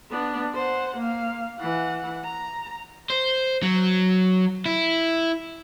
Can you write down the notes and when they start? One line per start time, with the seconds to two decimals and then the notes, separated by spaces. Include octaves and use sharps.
0.11 B3 D4
0.54 C5 F#5
0.97 A#3 F5
1.59 E3 F#5
2.24 A#5
3.10 C5
3.63 F#3
4.66 E4